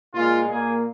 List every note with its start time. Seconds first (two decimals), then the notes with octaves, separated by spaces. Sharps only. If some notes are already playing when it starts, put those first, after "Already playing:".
0.14 A#2 G#3 F4
0.48 A#2 A#3 G#4